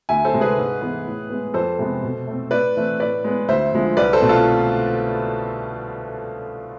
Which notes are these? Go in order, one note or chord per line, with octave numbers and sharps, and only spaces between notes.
D2 E5 G#5
A4 C5
C3 G#3 C4
G#4 B4
G#2
E3 B3
A2
G#3 B3
F2 A4 C5
C3 G#3 B3
B2
A3 C4
A2 B4 D5
E3 A3 C4
A2 B4 D5
G#3 B3
D2 C5 E5
D3 F3 G#3
C2 B4 D5
A4 C5
B2 A3 C4
F4 A4